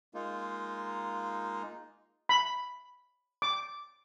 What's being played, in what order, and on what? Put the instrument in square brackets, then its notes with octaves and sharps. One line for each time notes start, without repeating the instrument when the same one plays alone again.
[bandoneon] G#3 A#3 D#4 F4
[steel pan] B5
D6